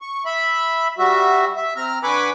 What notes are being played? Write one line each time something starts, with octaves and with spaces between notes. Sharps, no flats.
C#6
E5 B5
G3 F#4 E5
E5
C4 A#5 F6
D3 B4 G#5 B5 C#6 D6